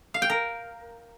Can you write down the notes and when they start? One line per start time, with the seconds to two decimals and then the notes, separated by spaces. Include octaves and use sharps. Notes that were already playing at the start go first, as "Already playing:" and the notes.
0.14 F5
0.22 G5
0.30 A#4